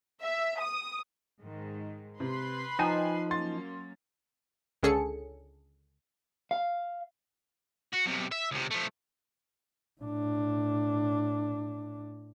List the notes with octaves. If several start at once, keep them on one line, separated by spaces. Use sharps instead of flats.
E5
D#6
G#2 D#3 G#3
C3 B4 B5 C6
F3 D#4 G5 G#5 D#7
F#3 A#3 C#4 C6 A6
C#2 D3 C#4 G#4 A4 C#7
F5
F#4
B1 C3
E5
C#2 C3
F3 A3
A2 D4